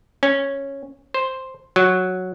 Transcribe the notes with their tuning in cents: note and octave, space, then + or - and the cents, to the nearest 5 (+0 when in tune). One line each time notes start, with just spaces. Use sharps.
C#4 -10
C5 +0
F#3 -5